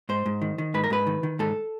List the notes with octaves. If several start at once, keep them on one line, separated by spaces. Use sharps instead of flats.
G#2 C5
G#2
D#3
D#3
G#2 B4
A#4
G#2 B4
D#3
D#3
G#2 A4